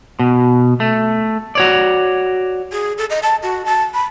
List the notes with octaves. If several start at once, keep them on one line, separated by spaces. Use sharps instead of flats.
B2
A3
F#4 C#5 D5
G#4
A4
D#5
A5
F#4
A5
B5